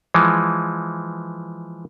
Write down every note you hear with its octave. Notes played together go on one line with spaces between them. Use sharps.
E3 F3 G#3